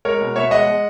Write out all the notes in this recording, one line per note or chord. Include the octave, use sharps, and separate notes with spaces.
G#3 A#4 C#5
B2
B2 C#5 E5
G#3 D#5 F#5
G#3